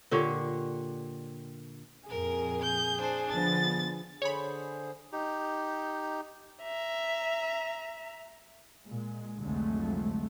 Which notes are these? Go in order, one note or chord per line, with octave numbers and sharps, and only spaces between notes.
A#2 D3 G4 C#5
F2 A#2 G#4 A#4
G6
D4 C5
D3 F3 B3 A6
D3 G#4 C5 C#5 B5
D#4 G4
E5 A#5
A#2 G#3
C2 F2 D3 F#3 G#3 A3